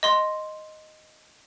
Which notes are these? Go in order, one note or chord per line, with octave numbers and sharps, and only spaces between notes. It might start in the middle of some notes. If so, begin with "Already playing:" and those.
D#5 C6